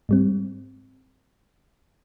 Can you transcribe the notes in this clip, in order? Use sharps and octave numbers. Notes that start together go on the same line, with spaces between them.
G#2 G3 C4